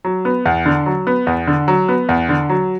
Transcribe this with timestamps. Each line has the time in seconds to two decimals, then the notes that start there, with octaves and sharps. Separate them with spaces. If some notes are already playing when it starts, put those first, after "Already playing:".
0.05 F#3
0.25 B3
0.45 E2
0.66 D3
0.86 F#3
1.07 B3
1.27 E2
1.47 D3
1.68 F#3
1.88 B3
2.09 E2
2.29 D3
2.49 F#3